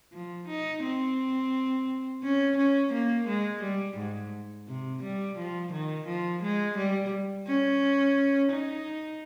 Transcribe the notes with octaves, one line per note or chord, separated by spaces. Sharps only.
F3
D#4
C4
C#4
C#4
A#3
G#3
G3
G#2
C3
G3
F3
D#3
F3
G#3
G3
C#4
D#4